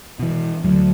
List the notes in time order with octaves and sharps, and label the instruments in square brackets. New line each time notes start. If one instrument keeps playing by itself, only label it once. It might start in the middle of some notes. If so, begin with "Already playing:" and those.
[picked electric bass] B2 E3
[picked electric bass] D2 [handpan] F#3